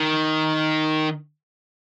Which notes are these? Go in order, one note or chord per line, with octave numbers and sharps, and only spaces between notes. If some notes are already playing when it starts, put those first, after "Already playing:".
Already playing: D#3